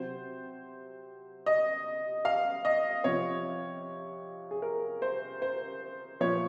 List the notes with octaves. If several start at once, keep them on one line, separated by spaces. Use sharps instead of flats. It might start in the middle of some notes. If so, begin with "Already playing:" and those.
Already playing: C3 F#3 C5
D#5
F5
D#5
C3 F3 C#5
G#4
A#4
C5
C5
A#2 F3 C#5